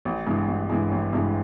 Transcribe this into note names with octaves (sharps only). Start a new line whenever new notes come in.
A1
G2 E3 G#3
A1
G2 E3 G#3
A1
G2 E3 G#3